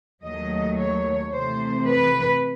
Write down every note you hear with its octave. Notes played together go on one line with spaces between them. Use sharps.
D#2 D#3 F#3 A3 D#5
C#5
C3 E3 A3 C5
B4